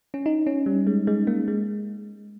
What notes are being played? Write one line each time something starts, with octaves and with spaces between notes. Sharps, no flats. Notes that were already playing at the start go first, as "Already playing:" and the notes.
C#4
D#4
C#4
G3
G#3
G#3
A#3
G#3